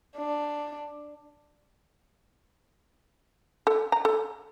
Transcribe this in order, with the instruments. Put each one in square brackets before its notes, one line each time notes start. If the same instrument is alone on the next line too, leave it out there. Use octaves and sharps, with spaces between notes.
[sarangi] D4
[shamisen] A4
A#5
A4